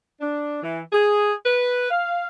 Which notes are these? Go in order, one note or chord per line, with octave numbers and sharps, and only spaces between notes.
D4
E3
G#4
B4
F5